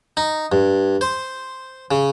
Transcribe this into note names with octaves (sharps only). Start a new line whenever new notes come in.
D#4
G2
C5
C#3